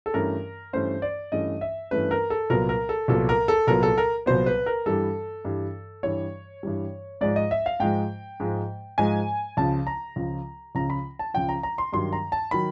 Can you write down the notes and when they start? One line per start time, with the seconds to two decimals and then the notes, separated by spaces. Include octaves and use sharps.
0.06 A4
0.14 G2 E3 A3 C#4 A#4
0.73 G2 E3 A3 C#4 C5
1.02 D5
1.32 G2 E3 A3 C#4 D#5
1.61 E5
1.91 G2 E3 A3 C#4 B4
2.11 A#4
2.30 A4
2.50 C2 A#2 F#3 B3 A#4
2.69 A#4
2.89 A4
3.08 C2 A#2 F#3 B3 A4
3.29 A#4
3.48 A4
3.67 C2 A#2 F#3 B3 A#4
3.83 A4
3.98 A#4
4.26 C2 A#2 F#3 B3 C5
4.46 B4
4.66 A#4
4.86 G2 E3 G3 A4
5.45 G2 E3 G3
6.03 G2 E3 G3 C#5
6.63 G2 E3 G3
7.21 G#2 F3 G#3 D5
7.36 D#5
7.51 E5
7.66 F5
7.80 G#2 F3 G#3 G5
8.40 G#2 F3 G#3
8.98 G#2 F3 G#3 G#5
9.57 C#2 C#3 F3 A5
9.87 A#5
10.16 C#2 C#3 F3
10.75 C#2 C#3 F3 A#5
10.90 B5
11.19 A5
11.34 C#2 C#3 F3 G5
11.49 A#5
11.63 A#5
11.78 C6
11.93 G2 D#3 F#3 C6
12.13 A#5
12.32 A5
12.51 D#3 F#3 B5